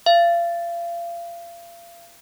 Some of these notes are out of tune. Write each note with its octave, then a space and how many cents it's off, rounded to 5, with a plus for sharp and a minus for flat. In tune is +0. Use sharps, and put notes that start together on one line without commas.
F5 -35